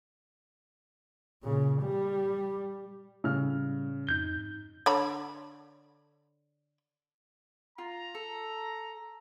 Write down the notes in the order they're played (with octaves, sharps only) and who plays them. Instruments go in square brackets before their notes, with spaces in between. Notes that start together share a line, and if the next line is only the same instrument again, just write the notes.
[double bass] A#2 C#3
G3
[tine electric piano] A2 G3 [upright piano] C#3 F6
[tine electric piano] F2 G#2 D#4 [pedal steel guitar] G6
[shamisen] D3 C#5 B5
[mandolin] F4 [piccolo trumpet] A#5
[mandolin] A4